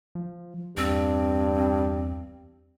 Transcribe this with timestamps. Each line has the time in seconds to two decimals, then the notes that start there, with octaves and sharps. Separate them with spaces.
0.15 F3
0.77 E2 G2 C4